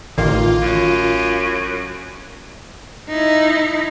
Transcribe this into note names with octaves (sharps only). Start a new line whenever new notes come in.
A1 D#3 A#3 F4
F#2
D#4 E4